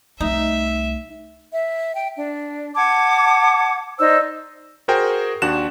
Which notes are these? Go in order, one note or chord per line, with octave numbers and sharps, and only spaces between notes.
C2 A3 D#4 E5
E5
G5
D4
F#5 A5 D6 G#6
D#4 C5 D5 E6
F#4 G#4 A#4 C5 G5
D#2 D4 F#4 F#6 E7